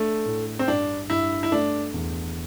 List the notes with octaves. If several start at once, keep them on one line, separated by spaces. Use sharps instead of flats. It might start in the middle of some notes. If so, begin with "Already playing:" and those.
Already playing: A3 D4
A2
C4
G2 D4
G2 E4
E4
A3 D4
E2